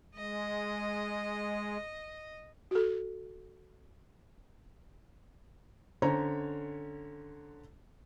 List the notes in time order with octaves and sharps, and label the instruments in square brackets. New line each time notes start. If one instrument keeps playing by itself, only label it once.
[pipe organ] G#3 [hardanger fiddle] D#5
[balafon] F#4 A4
[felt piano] D3 C#4 C5 C#5 A#5